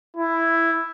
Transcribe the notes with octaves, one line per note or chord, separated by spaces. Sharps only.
E4